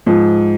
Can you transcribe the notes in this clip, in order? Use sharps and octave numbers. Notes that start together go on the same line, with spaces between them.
G#2 F3